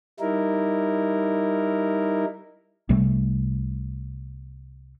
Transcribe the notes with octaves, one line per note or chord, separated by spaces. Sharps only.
G3 D#4 E4 A#4
C2 C3 G3 A3